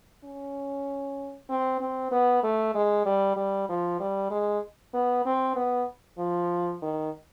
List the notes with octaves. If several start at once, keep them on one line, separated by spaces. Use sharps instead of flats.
C#4
C4
C4
B3
A3
G#3
G3
G3
F3
G3
G#3
B3
C4
B3
F3
D#3